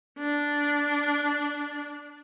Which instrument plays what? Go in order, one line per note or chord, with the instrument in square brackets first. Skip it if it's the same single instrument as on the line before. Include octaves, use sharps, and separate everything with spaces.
[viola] D4